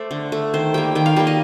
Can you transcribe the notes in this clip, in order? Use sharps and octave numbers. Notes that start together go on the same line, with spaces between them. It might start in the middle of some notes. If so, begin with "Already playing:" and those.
Already playing: A3 C5 D5
D3
A3
D#3 C5
G3 A#3 G5
D#3 G5
F5
G3 A#3
D#5